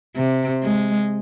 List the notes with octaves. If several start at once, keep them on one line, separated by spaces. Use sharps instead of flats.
C3
G#3